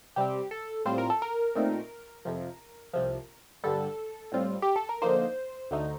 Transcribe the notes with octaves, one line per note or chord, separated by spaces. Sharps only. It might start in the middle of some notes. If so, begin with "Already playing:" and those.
C3 G3 C4 G4
A4
A2 G3 C4 F4 C5
A#4
A4
A#4
A#2 A3 C4 D#4
F2 C3 F3
C2 C3 F3
G2 D3 G3 A4
A2 G3 C4 F4
G4
A4
A#4
D3 F3 A#3 D#4 C5
D2 D3 A3 D#4